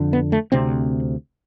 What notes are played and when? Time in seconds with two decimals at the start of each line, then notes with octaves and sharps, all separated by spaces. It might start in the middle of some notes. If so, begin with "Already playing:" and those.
Already playing: F2 D3
0.13 B3
0.32 A3
0.52 D2 C3 C4